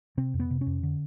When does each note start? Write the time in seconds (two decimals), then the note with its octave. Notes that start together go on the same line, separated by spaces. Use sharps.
0.17 C3 C4
0.34 F2
0.40 B3
0.50 C3
0.61 C#4
0.67 F2
0.83 D3